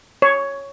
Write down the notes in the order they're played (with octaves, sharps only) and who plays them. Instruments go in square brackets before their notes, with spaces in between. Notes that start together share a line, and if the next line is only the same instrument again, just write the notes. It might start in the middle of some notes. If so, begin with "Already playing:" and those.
[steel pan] C#5